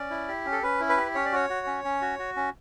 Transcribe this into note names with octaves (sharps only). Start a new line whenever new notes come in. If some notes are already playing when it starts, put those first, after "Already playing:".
Already playing: C#4 D5
E4
G4
C#4
A4
C#4 B4
E4
B4
G4
C#4 C#5
D5
F#4 C#5
F#4
C#4
C#4
F#4
F#4
C#4